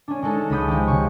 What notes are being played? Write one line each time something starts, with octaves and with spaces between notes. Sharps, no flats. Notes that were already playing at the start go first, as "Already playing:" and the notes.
C#4 D4
G#3 C#4 D#4 A4
C#2 F#3 B5 D#6 G6
F3 G#3 G4
C#3 C#5 C#6